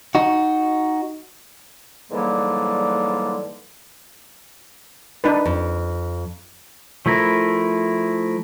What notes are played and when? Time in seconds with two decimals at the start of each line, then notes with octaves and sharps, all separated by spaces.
0.15 D#4 F#4
2.11 G#2 D3 E3 F#3 G3 A#3
5.24 D4 D#4 B4
5.45 F2
7.06 F3 A3 E4 A#4